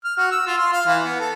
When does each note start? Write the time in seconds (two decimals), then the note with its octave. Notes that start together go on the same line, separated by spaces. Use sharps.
0.05 F6
0.17 F#4
0.31 E6
0.47 F4
0.58 C6
0.72 F5
0.86 E3
1.03 B3
1.20 A4